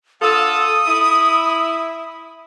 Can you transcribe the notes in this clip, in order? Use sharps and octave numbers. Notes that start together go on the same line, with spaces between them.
D3 F4 A4 D#6
E4